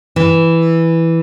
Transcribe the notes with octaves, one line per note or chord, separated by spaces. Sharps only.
E3